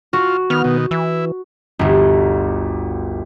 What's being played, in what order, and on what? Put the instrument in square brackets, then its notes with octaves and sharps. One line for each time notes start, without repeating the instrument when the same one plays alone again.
[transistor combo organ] F4 [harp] F#4
[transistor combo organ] D#3 F6 [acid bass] B3
[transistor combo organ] B2 D#3
[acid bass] E3 [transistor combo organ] E4
[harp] G1 D2